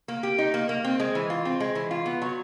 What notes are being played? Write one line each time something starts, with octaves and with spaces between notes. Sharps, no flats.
A#3
G4
D#4
A#3
A#3
C4
G#3
E3
F4
C4
G#3
E3
F4
B3
F#3